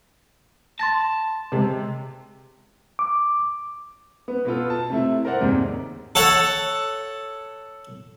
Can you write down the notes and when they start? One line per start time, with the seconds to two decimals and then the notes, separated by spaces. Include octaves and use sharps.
0.79 A5 C6 A6 A#6
1.52 C3 G#3
2.99 D6
4.28 B3
4.45 B2 B3 F4 A4
4.70 A5
4.90 C3 A3 E4
5.25 A#4 C5 D5 F#5
5.41 D#2 G#2 C3
6.15 A4 C#5 F#5 A5